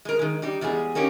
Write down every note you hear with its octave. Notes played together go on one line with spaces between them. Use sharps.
G#3 A#4
D#3 G#3
G3 D#4 G4
E2 G3 G#3 E4 G#4
A#3 C#4 D#4 G4